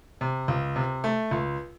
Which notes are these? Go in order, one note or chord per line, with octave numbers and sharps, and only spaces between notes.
C3
C#2
C3
A3
C#2